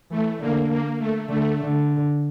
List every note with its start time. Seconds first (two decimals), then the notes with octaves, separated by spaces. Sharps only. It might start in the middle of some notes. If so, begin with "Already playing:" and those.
0.10 E3 A3
0.39 D3 A#3
0.69 A#3
0.99 A3
1.29 D3 A3
1.58 D3